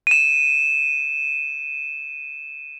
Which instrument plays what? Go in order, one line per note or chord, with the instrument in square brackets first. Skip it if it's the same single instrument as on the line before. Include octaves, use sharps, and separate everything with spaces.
[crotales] D#7 E7